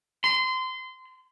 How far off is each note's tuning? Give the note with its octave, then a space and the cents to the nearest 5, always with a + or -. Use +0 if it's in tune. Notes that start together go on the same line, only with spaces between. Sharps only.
C6 -25